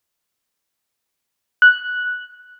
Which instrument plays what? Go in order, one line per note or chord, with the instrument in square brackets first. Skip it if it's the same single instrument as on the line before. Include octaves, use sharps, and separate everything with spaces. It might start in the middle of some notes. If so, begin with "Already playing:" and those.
[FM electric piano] F#6